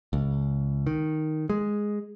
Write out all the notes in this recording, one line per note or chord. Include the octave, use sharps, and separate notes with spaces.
C#2
D#3
G#3